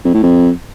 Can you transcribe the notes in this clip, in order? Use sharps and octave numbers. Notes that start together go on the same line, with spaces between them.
F2
A2
F2